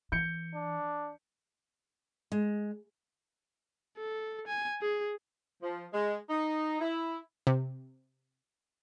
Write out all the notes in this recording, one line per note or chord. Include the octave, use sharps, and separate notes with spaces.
E3 G6 C#7
D4
G#3
A4
G#5
G#4
F3
G#3
D#4
E4
C3